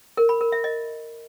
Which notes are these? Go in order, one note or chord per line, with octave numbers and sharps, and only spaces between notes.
A#4
B5
A#4
E5
D#5